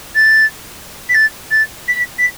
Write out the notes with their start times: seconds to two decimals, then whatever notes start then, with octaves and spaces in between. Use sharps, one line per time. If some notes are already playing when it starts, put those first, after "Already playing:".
0.15 A6
1.09 B6
1.14 A6
1.51 A6
1.88 B6
2.18 B6